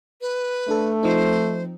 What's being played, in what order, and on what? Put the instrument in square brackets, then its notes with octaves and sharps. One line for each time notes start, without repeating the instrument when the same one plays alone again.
[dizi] B4
[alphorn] A3 [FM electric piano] D4 A4
[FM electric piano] F3 C4 D#4 [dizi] C5